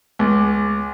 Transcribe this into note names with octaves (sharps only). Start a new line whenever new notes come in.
C#2